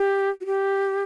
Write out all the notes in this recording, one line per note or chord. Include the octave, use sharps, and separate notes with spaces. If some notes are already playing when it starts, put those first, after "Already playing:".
Already playing: G4
F#4
G4